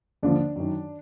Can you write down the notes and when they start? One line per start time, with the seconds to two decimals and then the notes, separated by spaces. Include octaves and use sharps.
0.23 D#2 D3 F3 D4
0.56 F#2 D#3